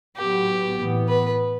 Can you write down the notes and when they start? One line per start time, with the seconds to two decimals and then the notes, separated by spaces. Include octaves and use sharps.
0.17 A2 F#3 B3 G4
0.79 A2 E3 B3
1.09 B4